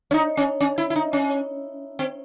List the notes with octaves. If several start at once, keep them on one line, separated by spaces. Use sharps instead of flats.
C#4
D#4
C#4
C#4
E4
E4
D#4
C#4
C4